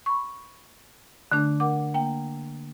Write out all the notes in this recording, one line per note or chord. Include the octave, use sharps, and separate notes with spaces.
B5 C#6
D3 A3 D4
A#4 F#5 D6
A#3 G5